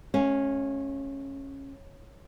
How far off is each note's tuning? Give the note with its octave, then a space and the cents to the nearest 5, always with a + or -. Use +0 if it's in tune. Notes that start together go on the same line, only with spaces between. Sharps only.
A3 -45 C#4 -15 F5 +0